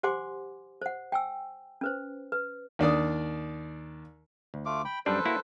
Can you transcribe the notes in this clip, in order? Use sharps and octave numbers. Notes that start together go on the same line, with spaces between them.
G4 C5 F#5 G#5 C6 D6
C5 F#5
G5 G#5 E6
C#4 B4 C5
B4
D#2 D4 D5 D#6
D2
A3 F4 D6
G5 B5
F#2 G3 D4 A4 B4 C5
A#3 E4 F#4